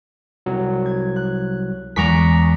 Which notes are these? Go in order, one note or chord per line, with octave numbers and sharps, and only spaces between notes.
C2 F#3
G#6
F#6
E2 G#3 A#5 C#6 D6 B6